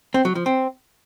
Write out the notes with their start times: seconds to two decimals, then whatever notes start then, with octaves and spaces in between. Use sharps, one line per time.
0.14 C4
0.25 F#3
0.35 F3
0.46 C4